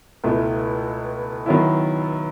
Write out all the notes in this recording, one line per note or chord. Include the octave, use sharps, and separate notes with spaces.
C#2 B2 A3 E4
D#3 F#3 B3 E4